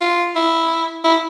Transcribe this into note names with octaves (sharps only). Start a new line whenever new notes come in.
F4
E4
E4